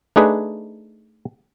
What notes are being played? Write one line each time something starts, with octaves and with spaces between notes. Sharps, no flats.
A3 D4 D#4 G#4 B4